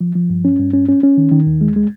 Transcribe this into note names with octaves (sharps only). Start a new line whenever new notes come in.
F3
F3
G2
C#4
G2
C#4
C#4
C#4
D#3
D#3
D#2
G#3
G#3